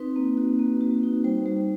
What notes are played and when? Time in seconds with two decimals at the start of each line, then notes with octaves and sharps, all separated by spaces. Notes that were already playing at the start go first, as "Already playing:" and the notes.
Already playing: C4 D#4 B4
0.16 A#3
0.38 F#4
0.59 A#3
0.81 F#4
1.03 D#4
1.24 G3 C5
1.46 G3